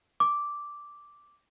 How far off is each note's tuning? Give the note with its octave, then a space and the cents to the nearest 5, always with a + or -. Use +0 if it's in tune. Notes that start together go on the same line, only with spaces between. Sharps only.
D6 -5